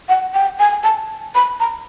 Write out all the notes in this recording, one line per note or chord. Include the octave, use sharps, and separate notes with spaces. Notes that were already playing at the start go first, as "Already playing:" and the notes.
F#5
G5
G#5
A5
B5
A#5